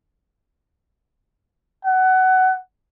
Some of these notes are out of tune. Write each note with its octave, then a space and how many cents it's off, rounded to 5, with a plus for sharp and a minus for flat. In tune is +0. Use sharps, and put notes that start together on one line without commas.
F#5 +20